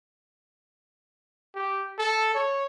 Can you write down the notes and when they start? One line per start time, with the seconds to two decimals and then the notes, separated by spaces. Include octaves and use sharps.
1.55 G4
1.99 A4
2.35 C#5